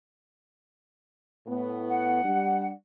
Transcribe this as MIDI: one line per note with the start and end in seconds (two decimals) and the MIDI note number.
1.47 2.21 45
1.47 2.21 59
1.89 2.68 78
2.24 2.72 55
2.24 2.72 62